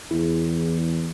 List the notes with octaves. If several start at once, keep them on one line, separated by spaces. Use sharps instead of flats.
E2 E4 G#4